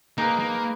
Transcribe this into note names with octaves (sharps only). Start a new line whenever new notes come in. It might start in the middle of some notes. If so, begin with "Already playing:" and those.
A#3 D#4 G#4 B4
A#3